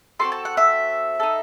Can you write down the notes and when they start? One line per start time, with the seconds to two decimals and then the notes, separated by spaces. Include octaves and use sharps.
0.19 C4 F#4 A4 C6
0.32 A5
0.45 F#5
0.57 E5
1.20 D#4 A4